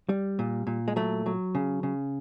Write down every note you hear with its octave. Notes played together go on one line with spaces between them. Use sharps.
G3
A#2
A#2
G#3
F#3 A3
F#3
C#3
C#3